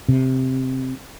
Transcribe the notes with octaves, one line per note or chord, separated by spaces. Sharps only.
C3